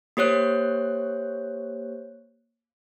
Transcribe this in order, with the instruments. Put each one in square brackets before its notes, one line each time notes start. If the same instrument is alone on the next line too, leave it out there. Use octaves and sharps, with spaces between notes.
[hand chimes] A#3 G4 C5 C#5 F#6